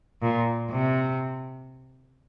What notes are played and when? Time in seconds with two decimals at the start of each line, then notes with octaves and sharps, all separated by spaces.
0.22 A#2
0.70 C3